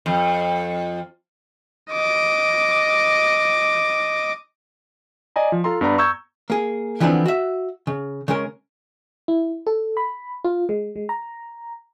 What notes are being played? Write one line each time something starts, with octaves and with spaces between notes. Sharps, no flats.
F2
D#5 D6
D5 D#5 G#5 A#5
F3
F4 A4 A#5 C6
G2 B3 D5 A#5
A#5 C#6 E6 G6 G#6
A#3 G#4
D3 E3 F3 B3 C4 D4
F#4 E5
C#3
C#3 G#3 C#4 A#4
E4
A4
B5
F4
G#3
G#3
A#5